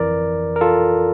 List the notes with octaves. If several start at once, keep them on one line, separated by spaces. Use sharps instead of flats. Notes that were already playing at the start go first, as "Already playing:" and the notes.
Already playing: G1 F2 E3 A#4 D5
A#4
F4 A4